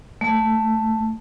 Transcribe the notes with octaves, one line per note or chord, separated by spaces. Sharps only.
A3